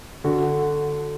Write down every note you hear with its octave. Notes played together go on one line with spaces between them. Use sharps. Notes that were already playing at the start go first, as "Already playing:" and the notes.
D3 F#4